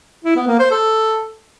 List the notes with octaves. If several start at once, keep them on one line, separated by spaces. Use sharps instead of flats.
E4
B3
A#3
C5
A4